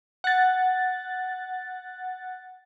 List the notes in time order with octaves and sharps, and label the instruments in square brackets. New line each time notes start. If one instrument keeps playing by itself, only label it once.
[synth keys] F#5 A6